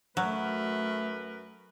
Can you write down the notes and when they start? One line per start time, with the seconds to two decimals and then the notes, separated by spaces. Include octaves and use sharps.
0.17 F#2 F#3 A3 A#4 B4